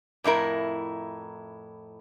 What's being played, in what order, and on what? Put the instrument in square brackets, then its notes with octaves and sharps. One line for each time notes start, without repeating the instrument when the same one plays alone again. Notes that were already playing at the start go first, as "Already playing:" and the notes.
[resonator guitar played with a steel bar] F2 A2 E4 A#4